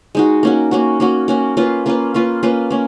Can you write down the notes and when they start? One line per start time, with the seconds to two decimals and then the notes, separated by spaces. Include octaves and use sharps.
0.15 G#3 D#4 F#4
0.43 A#3 C#4 F#4
0.71 A#3 C#4 F#4
1.00 A#3 C#4 F#4
1.28 A#3 C#4 F#4
1.57 A#3 C#4 F4 B4
1.86 A#3 C#4 F4 B4
2.14 A#3 C#4 F4 B4
2.43 A#3 C#4 F4 B4
2.70 A#3 C#4